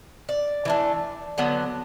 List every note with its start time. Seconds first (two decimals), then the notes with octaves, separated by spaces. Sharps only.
0.29 D5
0.65 E3 A3 D4
1.38 D3 F#3 B3